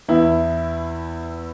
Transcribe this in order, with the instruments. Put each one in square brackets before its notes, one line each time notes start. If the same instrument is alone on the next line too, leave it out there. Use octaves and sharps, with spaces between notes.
[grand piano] E2 E3 E4